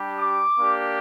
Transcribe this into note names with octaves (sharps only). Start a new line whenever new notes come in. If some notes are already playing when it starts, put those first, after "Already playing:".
Already playing: G3 D4 G4
D6
A#3 D4 G4